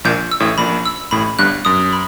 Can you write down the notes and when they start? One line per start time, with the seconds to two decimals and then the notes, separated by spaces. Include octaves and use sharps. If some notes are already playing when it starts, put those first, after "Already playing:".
0.04 A#1 A#2 G6
0.31 E6
0.40 A1 A2
0.58 A#1 A#2 B5
0.85 E6
1.11 A1 A2 B5
1.39 G1 G2 F#6
1.65 F#2 D#6
1.92 B5